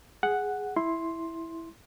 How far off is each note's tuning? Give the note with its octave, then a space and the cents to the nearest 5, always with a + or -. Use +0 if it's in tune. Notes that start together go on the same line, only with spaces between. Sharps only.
G#4 +0 F#5 +0
E4 +0 C6 +5